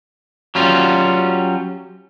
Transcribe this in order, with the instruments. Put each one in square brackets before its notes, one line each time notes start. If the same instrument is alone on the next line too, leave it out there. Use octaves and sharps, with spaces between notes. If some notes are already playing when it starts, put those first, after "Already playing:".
[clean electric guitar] F#3 G3 C#4 F4